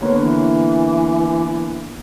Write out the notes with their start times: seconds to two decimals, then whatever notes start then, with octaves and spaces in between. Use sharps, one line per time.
0.01 D3 A#3 B3 C#5
0.22 E3